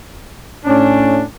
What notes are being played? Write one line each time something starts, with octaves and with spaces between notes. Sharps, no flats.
A2 C#4 D4